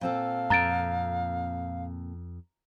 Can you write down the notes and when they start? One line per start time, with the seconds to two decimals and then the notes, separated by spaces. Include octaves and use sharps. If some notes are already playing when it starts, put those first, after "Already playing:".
0.01 A#2 C4 A4 F5
0.50 F2 A#5 A6 D7